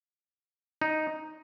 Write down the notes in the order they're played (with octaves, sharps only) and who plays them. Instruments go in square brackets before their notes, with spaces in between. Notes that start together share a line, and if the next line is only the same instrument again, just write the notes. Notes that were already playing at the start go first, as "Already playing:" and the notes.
[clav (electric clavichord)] D#4